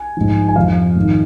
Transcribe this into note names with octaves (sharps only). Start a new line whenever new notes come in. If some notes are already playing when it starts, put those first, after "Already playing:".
Already playing: G#5
G#2 F3
G#5
F2 F3 F5
G#2 D#3